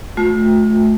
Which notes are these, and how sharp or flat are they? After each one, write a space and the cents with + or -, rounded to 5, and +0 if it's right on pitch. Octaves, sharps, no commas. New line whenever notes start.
A3 -25 F4 +45